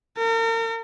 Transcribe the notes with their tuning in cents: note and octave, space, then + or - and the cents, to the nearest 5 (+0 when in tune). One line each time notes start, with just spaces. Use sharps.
A#4 -40